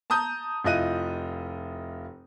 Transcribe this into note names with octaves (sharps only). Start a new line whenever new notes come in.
A5 A#5 D#6 G6
F1 E4 F4 D#5 F#6 D#7